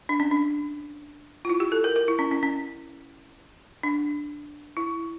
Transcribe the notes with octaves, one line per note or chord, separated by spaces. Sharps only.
D4
C#4
D4
F4
E4
G4
A4
A#4
A#4
E4
C#4
C#4
C#4
D4
E4